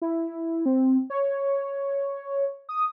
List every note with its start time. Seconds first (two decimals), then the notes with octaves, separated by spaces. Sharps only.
0.02 E4
0.66 C4
1.10 C#5
2.69 D#6